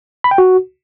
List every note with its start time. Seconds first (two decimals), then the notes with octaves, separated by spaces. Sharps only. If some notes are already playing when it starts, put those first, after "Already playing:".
0.24 B5
0.31 G5
0.38 F#4